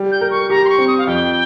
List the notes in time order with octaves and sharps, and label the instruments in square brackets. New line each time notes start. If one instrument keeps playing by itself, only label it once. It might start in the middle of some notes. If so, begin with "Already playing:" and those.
Already playing: [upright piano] G3
[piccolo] G6
[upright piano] A#4
[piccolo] C#6
[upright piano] G4 [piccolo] A#5
[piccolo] C6
C#6
[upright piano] C4
[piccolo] D#6
F5
[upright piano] F2 [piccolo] G5